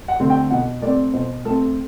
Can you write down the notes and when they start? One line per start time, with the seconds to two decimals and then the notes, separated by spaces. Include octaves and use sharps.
0.08 F#5
0.20 D3 A3 C4
0.30 G5
0.51 B2 F#5
0.82 A3 C4 D5
1.14 B2 C5
1.45 A3 C4 A4